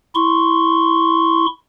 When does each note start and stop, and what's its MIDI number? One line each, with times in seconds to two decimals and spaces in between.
0.15 1.46 64
0.15 1.46 84
0.15 1.46 85